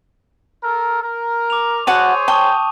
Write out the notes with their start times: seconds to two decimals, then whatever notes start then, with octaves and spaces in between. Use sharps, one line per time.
0.64 A4 A#4
1.03 A#4
1.50 D6 F7
1.87 F#4 G#4 C5 C#5 F#5 A5 D#7
2.28 G5 A5 C#6 D#6